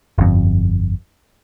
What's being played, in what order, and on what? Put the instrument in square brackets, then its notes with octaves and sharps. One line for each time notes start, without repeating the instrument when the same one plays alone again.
[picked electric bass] G1 F2